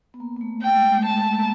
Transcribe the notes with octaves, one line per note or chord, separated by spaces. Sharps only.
B3
A#3
A#3
A3
A3 G5
G#3
A3
G#3
A3
G#3 A5
A3
A#3